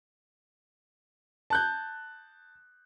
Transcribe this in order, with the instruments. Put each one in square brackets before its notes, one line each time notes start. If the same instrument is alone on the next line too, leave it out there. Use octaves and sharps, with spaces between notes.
[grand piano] A5 F#6 G6